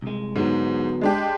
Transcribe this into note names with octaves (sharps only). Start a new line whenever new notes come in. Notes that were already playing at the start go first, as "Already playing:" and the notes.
C2 G#3
G#2 D3 F#3 B3
G#3 D4 G4